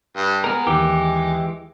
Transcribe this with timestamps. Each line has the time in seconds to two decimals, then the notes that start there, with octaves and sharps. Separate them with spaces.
0.16 G2
0.44 G#3 B3 A#4
0.67 D#2 D#3 E3 G4